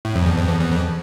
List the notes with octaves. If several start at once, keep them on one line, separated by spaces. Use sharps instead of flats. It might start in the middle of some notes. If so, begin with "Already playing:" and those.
A2
F2
E2
F2
E2
E2
F2